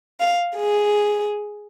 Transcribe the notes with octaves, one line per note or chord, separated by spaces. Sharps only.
F5
G#4